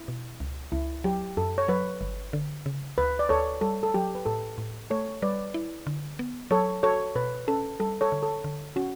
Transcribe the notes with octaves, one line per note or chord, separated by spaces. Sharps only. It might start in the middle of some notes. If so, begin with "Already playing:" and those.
Already playing: E4
B2
C#2
C#2 E4
F#3 G4
F#2 A4
C#5
F#3 B4
G1
D3
C#3
D2 B4
D5
D2 A4 C#5
G3 A4
A4
F#3 G4
B4
A2 A4
A2
A3 A4 C#5
G3 B4 D5
E4
D3
B3
F#3 A4 C#5
F#4 A4 C#5
B2 B4
C#4 A4
G3 A4
A4 C#5
D3
A4
D3
C#4 F#4